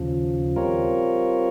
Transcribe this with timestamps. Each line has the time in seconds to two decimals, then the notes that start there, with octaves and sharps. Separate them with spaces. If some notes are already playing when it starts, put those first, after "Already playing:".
Already playing: D#2 C#3 F3
0.56 G3 C4 F4 A#4 C#5